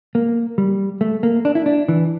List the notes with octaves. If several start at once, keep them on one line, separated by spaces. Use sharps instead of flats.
A#3
G3
A3
A#3
D4
E4
D4
E3